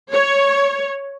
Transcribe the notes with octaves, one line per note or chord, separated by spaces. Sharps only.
C#5